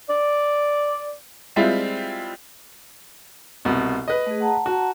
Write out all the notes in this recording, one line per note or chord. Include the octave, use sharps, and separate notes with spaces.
D5
G3 G#3 C4 E4 F4
C2 B2
B4 D#5
A3 G#4
F#5 A5 A#5
F#4